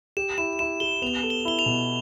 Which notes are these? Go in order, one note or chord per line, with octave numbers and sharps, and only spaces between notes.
G4 E7
E4 E7
E4 E7
G4 G7
B3 F7
A4
G7
E4 G7
F7
B2